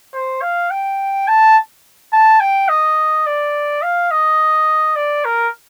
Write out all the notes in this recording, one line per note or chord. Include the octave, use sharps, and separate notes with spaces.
C5
F5
G5
A5
A5
G5
D#5
D5
F5
D#5
D5
A#4